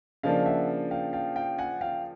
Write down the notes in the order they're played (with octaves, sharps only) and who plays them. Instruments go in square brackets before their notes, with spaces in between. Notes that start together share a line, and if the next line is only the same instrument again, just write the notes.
[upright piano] C#3 F3 A#3 D4 [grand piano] D#5 F5
[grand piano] E5 F#5
F5 G5
F5 G5
F5 G5
F#5 G#5
F5 G5